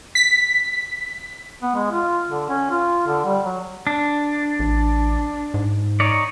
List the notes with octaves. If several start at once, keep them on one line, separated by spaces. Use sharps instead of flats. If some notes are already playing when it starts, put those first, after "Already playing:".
B6
B3
G#3
F4
D3
C#4
F4
D3
G3
F#3
D4
A1
G#2
D#4 C#5 D5